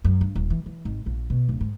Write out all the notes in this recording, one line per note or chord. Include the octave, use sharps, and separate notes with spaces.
F#2
G2
D#1
E3
E3
G#1
A#1
B2
D1
G#2